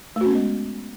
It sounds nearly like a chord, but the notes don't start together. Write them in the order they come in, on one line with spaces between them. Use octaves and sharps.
A3 F#4 C#4 B3 G#3